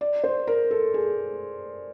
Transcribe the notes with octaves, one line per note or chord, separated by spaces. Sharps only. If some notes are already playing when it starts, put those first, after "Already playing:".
D5
C5
A#4
A4
G#4